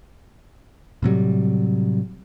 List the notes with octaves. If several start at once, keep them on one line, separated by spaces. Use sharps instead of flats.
A2 C3 F#3 G3